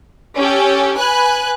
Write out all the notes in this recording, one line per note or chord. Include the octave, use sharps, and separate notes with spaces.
C#4 G4 A4
B4 G#5 F#6